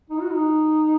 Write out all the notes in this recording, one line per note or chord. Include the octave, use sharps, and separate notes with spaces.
D#4
F#4
D#4